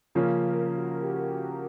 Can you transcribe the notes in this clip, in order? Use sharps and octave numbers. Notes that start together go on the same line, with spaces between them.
C#3 F3 A#3 C#4
A#4
F#4
G4
F#4